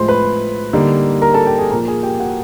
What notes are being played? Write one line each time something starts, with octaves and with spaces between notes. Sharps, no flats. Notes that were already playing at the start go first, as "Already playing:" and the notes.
Already playing: A2 F3 G#3 C5 C6
B4 B5
D3 G3 A#3 D#4
A#4 A#5
A4 A5
G4 G5
G#4 G#5
A#2 F3 A#3 A#4 A#5
G#4 G#5
G4 G5
F#4 F#5